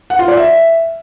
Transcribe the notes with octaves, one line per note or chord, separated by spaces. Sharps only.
F#5
F4
D5
E5